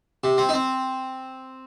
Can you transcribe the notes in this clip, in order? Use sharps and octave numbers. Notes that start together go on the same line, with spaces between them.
C3
C4
D#4
C4